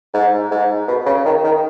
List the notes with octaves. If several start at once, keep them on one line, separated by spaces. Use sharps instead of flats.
G#2
G#2
B2
C#3
D#3
D#3